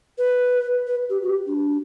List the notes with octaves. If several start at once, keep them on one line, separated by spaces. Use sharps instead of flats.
B4
B4
G4
F#4
G4
D4